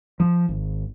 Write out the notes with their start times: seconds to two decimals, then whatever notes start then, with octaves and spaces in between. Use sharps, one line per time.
0.20 F3
0.48 G#1